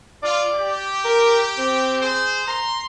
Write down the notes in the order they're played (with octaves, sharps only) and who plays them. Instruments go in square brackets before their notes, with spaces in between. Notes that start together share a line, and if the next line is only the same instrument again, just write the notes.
[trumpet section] F4 [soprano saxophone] D5
[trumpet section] G4
[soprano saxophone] A#4
C4
[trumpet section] G#4 C5
[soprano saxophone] A#5 [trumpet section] C6